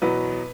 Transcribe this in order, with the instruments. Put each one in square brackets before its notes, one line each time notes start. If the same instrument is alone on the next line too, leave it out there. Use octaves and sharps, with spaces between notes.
[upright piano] E2 B2 F#3 B4